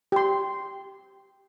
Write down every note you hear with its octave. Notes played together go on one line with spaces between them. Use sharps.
G4 C6